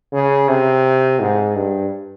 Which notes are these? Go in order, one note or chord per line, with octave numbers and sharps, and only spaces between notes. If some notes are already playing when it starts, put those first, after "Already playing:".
C#3
C3
G#2
G2